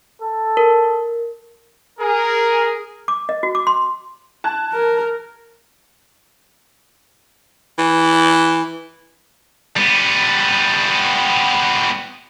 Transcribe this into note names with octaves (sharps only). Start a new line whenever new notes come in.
A4
A#4
G#4 A#4
D6
D#5
F#4
D6
C6
A5 F#6 G#6
A#4
E3
G3 B3